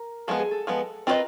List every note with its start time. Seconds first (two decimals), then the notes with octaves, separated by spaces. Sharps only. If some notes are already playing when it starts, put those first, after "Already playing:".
Already playing: A#4
0.27 F3 G#3 B3 A4
0.39 G#4
0.51 A4
0.67 F3 G#3 B3
1.07 C4 F4 G#4 A#4 B4 D#5